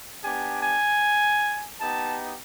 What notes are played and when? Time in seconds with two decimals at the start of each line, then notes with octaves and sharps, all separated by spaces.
0.23 B3 D4 G4 G#5
0.63 G#5
1.80 B3 D#4 G4 A5